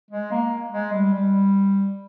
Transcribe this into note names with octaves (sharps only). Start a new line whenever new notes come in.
G#3
A#3
G#3
G3
G3